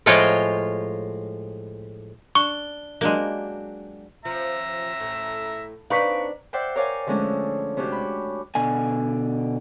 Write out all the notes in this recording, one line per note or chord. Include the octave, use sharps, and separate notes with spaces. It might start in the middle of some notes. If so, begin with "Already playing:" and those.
A2 F3 G#3 F4 C#5 G5
D4 C#6 G7
F#3 G#3 A#3 D4 G4
F3 E5 A#5
A2
C4 D4 D#4 B4 F5 A#5 C#6 B6
C5 D5 E5 F#5 G5
A#4 C#5 D5 F5 G5 G#5
D3 F3 G#3 A3 C#4 D4
C3 C#4 D4 F#4 G4
B5
B2 D3 G#5